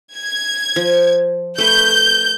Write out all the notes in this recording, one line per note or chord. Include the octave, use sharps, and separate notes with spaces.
G#6
F3
A3 B4 G6